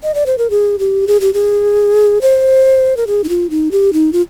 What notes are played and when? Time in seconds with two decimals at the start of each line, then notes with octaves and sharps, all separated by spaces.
0.03 D#5
0.14 D5
0.26 C5
0.38 A#4
0.50 G#4
0.79 G4
1.07 G#4
1.21 G4
1.34 G#4
2.21 C5
2.97 A#4
3.07 G#4
3.24 D#4
3.29 F4
3.50 D#4
3.71 G4
3.93 D#4
4.13 F4